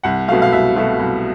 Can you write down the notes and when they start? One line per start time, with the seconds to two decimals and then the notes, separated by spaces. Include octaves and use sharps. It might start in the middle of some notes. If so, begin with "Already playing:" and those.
0.03 C2 F#5
0.28 B2 F#3 A3 F5
0.42 F5
0.52 C2 E5
0.76 B2 F#3 A3
0.99 C2